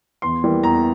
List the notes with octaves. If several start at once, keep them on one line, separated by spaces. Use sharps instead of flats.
E2 C6
E3 G3 A#3
E2 A#5